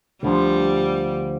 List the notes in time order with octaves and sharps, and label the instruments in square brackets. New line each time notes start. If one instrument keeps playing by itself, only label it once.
[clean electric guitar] D2 D3 F3 [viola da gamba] G3